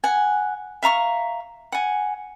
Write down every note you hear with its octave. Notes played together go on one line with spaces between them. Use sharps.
F#5 G#5
E5 F5 A#5 C#6
F#5 G#5